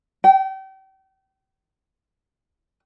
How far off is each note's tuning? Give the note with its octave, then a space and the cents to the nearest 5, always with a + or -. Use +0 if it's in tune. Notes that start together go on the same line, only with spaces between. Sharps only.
G5 -35